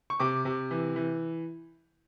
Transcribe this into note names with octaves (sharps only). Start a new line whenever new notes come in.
C#6
C3 D6
C3
E3
E3